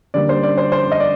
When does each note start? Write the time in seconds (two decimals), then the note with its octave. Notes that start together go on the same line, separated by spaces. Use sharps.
0.14 D3 G3 A#3 D5
0.29 C5
0.43 D5
0.58 C5
0.72 C5
0.92 D#5
1.00 D5